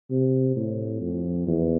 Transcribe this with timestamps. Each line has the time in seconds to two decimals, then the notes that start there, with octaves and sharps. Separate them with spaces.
0.11 C3
0.56 A2
1.01 F2
1.47 E2